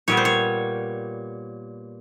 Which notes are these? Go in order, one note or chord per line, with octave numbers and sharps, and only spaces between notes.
A#2 G3 B3 C#5
C5
C#5